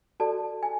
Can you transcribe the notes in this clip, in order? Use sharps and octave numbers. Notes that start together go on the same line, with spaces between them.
F#4 A4 D5 A5
G#5